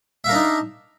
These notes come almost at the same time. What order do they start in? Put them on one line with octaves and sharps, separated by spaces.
E5 F5 A#4 D4 D#4